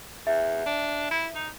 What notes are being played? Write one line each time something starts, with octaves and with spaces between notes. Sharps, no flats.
E2 E5
D4
E4
D#4